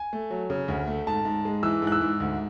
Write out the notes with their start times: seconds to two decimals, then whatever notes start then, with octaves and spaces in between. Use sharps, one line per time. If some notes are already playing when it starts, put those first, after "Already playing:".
Already playing: G#5
0.13 A3
0.31 F#3
0.50 C#3
0.68 D2
0.87 A3
1.07 G#2 A5
1.25 G#2
1.45 G#3
1.63 E3 E6
1.82 G#2
1.87 F#6
1.92 E6
2.01 G#2
2.20 D2